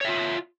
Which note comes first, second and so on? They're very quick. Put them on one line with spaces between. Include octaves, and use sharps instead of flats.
C#5 E5 F4